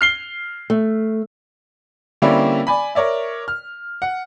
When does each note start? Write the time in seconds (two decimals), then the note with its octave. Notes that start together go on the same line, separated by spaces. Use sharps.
0.01 F6 C7 G7
0.70 A3
2.22 D3 G3 A#3 C4 C#4 E4
2.67 D5 G#5 B5
2.95 A#4 C#5 D5 E5
3.48 F6
4.02 F#5